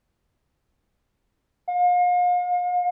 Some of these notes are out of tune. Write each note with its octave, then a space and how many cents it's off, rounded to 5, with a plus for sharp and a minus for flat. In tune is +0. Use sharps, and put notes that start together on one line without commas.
F5 +40